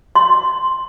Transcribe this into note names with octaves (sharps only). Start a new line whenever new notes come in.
C6